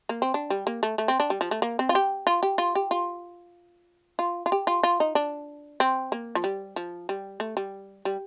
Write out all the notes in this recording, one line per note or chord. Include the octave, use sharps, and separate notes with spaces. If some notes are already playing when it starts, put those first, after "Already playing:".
A#3
C4
D4
G3
A#3
A3
A3
C4
D4
G3
F3
A3
A#3
C4
F4
G4
F4
G4
F4
G4
F4
F4
F4
G4
F4
F4
D#4
D4
C4
A#3
F3
G3
F3
G3
A3
G3
G3